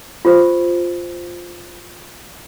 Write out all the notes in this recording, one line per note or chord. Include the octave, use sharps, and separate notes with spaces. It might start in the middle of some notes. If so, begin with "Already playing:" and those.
F4 G4 C5